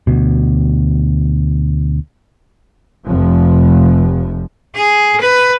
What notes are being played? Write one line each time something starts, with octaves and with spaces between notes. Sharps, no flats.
D2 B2
F1 F3
G#4
B4